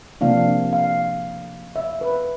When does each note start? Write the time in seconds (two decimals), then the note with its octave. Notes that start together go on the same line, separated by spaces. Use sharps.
0.21 C3 F3 A#3 D4 F5
0.73 F5
1.76 E5
2.01 B4